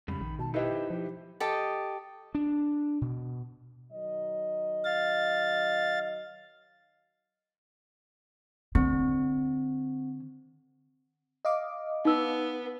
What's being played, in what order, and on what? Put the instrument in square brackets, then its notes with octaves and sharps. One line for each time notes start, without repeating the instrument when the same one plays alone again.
[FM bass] F2 [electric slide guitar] G#2 C#3 G3 [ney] B5
[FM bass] A#1 [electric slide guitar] D#3
[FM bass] B2 [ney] A5
[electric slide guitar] D#4 C5 E5 [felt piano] E4 B4 D#5 [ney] G4
[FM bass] F3 [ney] G4
[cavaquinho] G4 A4 D#5
[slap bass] D4
B2
[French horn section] D#3 F#3 D#5
[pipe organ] F5 A6
[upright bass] D3 [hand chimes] C4
[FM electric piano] D#5 F5 D6
[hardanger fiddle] B3 [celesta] D#4 E6